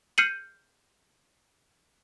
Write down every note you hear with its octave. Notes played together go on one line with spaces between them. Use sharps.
F6 G6 C7 C#7 D#7 F#7